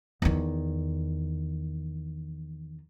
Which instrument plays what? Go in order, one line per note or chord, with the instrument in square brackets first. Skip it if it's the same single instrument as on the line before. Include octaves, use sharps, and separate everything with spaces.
[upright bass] E2 D#3